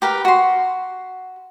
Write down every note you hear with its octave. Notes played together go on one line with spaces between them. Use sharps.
G4 A#4 B4 G5
F#4 C6